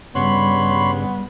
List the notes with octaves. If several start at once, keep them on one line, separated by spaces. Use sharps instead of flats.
G2 C#3 G3 B3 C#5 B5 C6